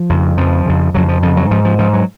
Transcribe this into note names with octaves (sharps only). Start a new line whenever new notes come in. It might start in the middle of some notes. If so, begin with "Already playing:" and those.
Already playing: F3
F2 C#3
F2 C#3 F3
F2 C#3
F2 C#3 F#3
F3
F2 C#3 F3
F#3
G#2 F3
F3
G#2 F3
F#3